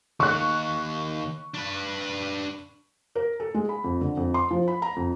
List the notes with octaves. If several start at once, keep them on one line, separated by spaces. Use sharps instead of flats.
D#2 C#6 F#6
D4 B4
A#4
A4
G#3
B5
F2
D3
F2
C6
F3
B5
A#5
F2